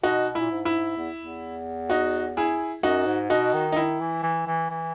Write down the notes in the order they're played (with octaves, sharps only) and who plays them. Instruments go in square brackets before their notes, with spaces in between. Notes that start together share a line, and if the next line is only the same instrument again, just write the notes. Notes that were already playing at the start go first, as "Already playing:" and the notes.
[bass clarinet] B2 [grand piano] D#4 F#4
[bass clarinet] A#2 [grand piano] E4
[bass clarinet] G#2
[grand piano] E4
[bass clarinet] E2
E2
[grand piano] D#4 F#4
E4 G#4
[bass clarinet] F#2 [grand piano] D#4 F#4
[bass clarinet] G#2
[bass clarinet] B2 [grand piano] D#4 F#4
[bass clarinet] D#3
[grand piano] D#4
[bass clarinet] D#3 [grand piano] E4
[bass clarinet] E3
E3
E3
E3